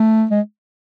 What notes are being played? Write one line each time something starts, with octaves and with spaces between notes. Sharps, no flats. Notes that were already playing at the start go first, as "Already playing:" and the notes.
Already playing: A3
G#3